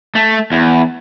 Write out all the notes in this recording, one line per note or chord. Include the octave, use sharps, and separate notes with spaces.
A3
E2